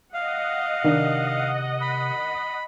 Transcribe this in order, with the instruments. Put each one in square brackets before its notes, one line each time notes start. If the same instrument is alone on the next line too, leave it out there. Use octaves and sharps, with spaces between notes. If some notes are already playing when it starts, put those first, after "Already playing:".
[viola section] D#5 F#5 [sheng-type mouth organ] F5
[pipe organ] C3 [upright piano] D#3 D4
[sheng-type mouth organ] B5